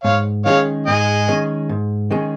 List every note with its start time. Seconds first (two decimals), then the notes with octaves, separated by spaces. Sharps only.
0.04 G#2 C#5 F5
0.46 D#3 G#3 C#4 G#4 C#5 F5
0.86 G#2 D#5 G#5
1.28 D#3 G#3 C#4 G#4
1.69 G#2
2.11 D#3 G#3 C#4 G#4